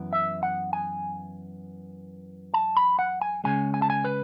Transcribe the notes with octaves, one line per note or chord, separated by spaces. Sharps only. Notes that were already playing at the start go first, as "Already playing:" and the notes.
Already playing: F#2 E3 B3
E5
F#5
G#5
A5
B5
F#5
G#5
C#2 C#3 G#3 C#4 G#5
G#5
A5
G#5
B4